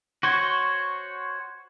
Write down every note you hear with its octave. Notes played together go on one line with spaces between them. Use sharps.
F#4 C5 C#5